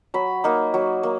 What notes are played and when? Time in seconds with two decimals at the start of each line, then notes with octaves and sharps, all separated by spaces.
0.14 F#3 B5
0.44 A#3 D#4
0.74 F#3
1.03 A#3